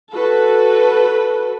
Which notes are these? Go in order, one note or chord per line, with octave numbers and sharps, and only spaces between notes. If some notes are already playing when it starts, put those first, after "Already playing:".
F#4 A4 B4